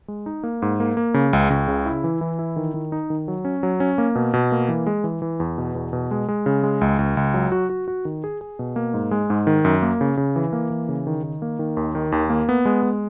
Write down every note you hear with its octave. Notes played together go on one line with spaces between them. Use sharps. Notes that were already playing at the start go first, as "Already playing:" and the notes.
G#3
D#4
A#3
G#2
A#3
A#3
C#3
C#2
C#2
C#3
E4
E3
E3
E4
D#3
D#3
D#4
D#3
F#3
C#4
F#3
C#4
A#3
B2
B2
A#3
E3
G#3
E3
E3
E2
B2
E2
B2
G#3
G#3
C#3
G#3
C#2
C#2
C#2
F#3
F#4
F#4
F#4
D#3
G#4
G#4
B2
A#3
G#2
G#3
G#2
D#3
F#2
A#3
C#3
C#3
E3
A#3
E3
C#3
D#3
D#3
A#3
D#3
D#2
D#3
D#2
A#3
B3
G#3
G#3